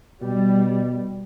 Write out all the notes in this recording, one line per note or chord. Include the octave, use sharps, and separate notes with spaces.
B2 G3